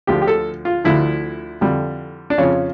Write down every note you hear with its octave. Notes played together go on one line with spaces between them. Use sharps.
D2 D3 F3 G4
G4
A4
F4
D2 D3 F3 E4
F2 D3 G3
D4
F2 C#3 F3 C#4